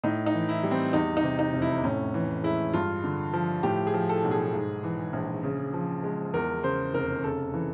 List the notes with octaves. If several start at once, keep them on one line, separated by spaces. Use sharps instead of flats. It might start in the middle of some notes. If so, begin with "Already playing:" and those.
A2 D#4
D#4
E3
E4
G3
C4
E2 D#4
D#4
C3
D#4
F1
E4
A2 C#4
E3
G#3 E4
G2 F4
D3
F3
A2 G4
G#4
F3
A4
B1
G#4
G#2
E3
A#1
C#3
F3
G#3
E2 A#4
C#3 C5
F1 A#4
C#3 A4
E3